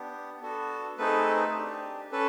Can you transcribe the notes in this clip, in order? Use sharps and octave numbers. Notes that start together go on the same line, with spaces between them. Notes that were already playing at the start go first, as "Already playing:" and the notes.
Already playing: B3 D4 G4
B3 D4 F#4 A4
A3 C4 D#4 G#4 A4 B4
D4 G4
C#4 A4 B4